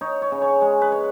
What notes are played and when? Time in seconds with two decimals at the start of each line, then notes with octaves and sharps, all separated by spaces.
0.01 D#4 C#5
0.22 C#5
0.32 C#3
0.42 C#5
0.61 G#3
0.82 B4
0.92 C#5